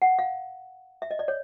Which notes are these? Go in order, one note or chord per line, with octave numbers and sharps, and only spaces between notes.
F#5
F5
E5
D#5
D5
C#5